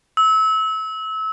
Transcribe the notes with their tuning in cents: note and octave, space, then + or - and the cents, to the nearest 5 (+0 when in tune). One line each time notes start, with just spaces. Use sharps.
E6 -30